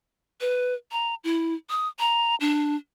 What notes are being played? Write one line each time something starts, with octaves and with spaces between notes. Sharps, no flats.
B4
A#5
E4
D#6
A#5
D4